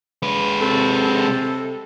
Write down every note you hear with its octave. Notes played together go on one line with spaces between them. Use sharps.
G#3 B4
C3 A4